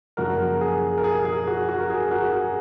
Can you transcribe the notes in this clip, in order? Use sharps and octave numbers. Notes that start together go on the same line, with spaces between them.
F#2 C#3 F3 A#3 F#4 A#4
G#4
A#4
G#4
G#4
F#4
F#4
A#4
G#4
F#4 A#4
G#4